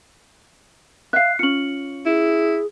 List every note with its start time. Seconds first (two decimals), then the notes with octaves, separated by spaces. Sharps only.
1.13 E5 F5 F#6 C7
1.39 C#4 F4 C#7 F#7
2.06 E4 G#4